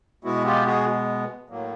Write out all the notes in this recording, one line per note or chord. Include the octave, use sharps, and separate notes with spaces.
B2 G#3 B3 E4 F#4
F4 G4
F#4 G#4
A2 F#3 A#3